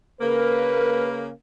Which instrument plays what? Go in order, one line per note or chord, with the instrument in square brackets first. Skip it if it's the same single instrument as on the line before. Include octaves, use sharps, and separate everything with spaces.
[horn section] C#3 A#3 [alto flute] A#4 [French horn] B4